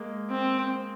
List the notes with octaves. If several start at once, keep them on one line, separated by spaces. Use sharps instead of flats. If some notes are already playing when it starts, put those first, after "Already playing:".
Already playing: G#3 A#3
C4